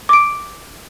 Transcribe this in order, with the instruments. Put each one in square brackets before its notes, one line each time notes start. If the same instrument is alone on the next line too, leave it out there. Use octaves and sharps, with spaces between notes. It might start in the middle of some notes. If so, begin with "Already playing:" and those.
[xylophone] D6 D7